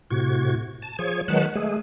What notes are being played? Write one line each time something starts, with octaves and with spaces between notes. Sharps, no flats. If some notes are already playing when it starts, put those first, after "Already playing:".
A2 C3 F#4 G#6
A5
F3 G#4 C#5 G#6
D#3 F#3 G#3 B4 F#5 A5
G#3 A3 G#4